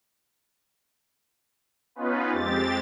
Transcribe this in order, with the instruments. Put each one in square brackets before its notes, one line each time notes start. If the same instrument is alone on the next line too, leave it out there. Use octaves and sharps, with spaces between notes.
[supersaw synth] B3 C#4 D#4 F4 B4
F2 G#3 C4 G4 A6